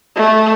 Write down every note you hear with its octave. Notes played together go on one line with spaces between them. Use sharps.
A3